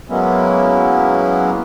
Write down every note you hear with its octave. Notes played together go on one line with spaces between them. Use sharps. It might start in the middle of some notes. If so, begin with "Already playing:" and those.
F#3 G#3 A#3 B3 C#4 E4